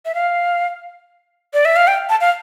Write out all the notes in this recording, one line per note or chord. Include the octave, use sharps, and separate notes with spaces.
E5
F5
D5
E5
F5
G5
A5
F5